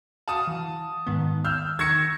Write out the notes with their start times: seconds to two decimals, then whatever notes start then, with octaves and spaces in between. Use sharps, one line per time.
0.28 F#4 F5 A5 D#6
0.47 E3
1.07 G#2 D#3 B3
1.44 E6 F6 G6
1.79 D#3 C#6 E6 G#6 A#6 C#7